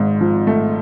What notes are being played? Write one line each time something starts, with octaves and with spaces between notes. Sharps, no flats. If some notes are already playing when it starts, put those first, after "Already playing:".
Already playing: G#1 G#2
F3
A3